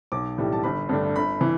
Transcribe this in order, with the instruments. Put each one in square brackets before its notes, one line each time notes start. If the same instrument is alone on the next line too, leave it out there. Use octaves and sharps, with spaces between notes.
[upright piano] B1 D6
A2 E3 G3
A5
G1 B5
G2 D3 A3 D4
G1 B5
E3